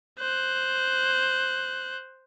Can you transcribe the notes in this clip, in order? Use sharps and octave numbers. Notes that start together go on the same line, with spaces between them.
C5 F#6